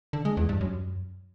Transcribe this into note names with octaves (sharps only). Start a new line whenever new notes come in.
D3
G#3
E2
G2
F#2